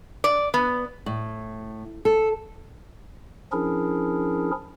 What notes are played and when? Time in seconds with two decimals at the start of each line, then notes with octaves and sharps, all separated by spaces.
0.24 D5
0.54 B3
1.06 A2
2.05 A4
3.52 F3 C#4 D4 E4 G#4 A#4